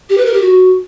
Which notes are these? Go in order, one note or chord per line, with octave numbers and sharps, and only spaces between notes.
G4
B4
A#4
G4
F#4